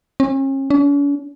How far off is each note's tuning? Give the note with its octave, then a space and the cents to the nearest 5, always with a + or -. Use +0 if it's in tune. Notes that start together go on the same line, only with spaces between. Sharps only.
C#4 -40
C#4 +45